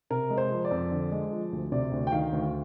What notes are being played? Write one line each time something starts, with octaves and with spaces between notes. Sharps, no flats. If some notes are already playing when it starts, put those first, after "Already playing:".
C3 A#4
G#3
C5
F3
D5
F2
D3
G#3
F3
D2
C3 D5
D2
G5
D#3 F5
D2